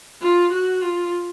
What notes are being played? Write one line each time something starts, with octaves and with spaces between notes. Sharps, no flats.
F4
F#4
F4